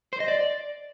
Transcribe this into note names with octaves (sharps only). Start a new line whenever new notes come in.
C5
D#5
D5